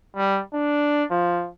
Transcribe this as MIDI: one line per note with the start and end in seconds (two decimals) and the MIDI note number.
0.17 0.41 55
0.54 1.04 62
1.11 1.49 53